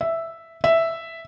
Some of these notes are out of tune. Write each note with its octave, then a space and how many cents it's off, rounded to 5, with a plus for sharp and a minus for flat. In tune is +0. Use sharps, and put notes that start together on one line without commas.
E5 +0
E5 +0